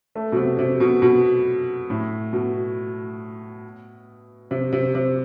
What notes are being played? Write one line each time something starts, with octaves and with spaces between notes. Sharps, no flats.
A3
B2
C3
C3
B2
B2
A2
B2
C3
C3
C3